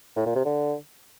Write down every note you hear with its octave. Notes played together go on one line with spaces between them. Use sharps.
A2
A#2
C3
D3